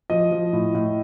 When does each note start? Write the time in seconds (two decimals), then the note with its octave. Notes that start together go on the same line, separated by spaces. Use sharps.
0.10 F3 D#5
0.31 F3
0.53 A2
0.75 A2